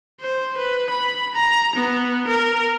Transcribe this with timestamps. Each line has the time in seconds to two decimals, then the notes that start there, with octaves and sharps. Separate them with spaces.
0.21 C5
0.57 B4
0.90 B5
1.35 A#5
1.75 B3
2.27 A#4